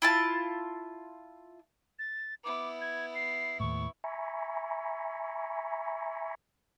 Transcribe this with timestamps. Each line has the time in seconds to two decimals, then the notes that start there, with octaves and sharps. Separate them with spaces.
0.02 E4 F4 A5
1.99 A6
2.44 B3 E4 D6
2.81 G#6
3.15 C7
3.60 D#2 A2 C#6
4.04 E5 G#5 A#5 B5 C#6